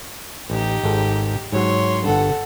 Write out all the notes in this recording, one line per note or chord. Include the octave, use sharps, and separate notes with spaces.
A1 D#4 G4
G#1 G#2 A4
G#2 F#3 C#5 C6
G1 G2 A4 F#5